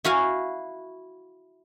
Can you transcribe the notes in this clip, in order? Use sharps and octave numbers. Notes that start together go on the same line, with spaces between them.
E4 F#4 F5 G#5